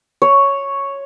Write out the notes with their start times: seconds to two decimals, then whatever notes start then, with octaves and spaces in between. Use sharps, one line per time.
0.22 C#5